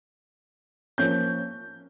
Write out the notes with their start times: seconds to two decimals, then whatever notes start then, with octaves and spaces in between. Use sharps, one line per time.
0.98 F3 A#3 C#4 G6